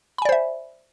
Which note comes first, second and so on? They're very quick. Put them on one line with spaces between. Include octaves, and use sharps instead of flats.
B5 G#5 D5 C5 E5